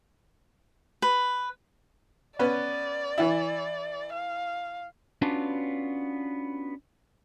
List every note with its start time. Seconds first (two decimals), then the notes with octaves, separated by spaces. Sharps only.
1.02 B4
2.39 B3 C#4 B4 D5
3.18 E3 E4
4.13 F5
5.22 B3 C#4 D4 F4 F#4 B4